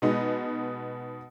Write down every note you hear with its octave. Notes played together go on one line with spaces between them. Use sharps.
B2 G#3 B3 D#4